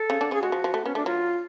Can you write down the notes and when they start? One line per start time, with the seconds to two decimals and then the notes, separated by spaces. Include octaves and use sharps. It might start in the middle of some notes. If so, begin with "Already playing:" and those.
Already playing: A4
0.10 C#3 C#4
0.21 D3 D4
0.31 C#3 C#4 G#4
0.42 G#3 F#4
0.52 F3
0.64 F3
0.74 A3
0.85 B3 C#4
0.95 A3 D4
1.06 F#3 F4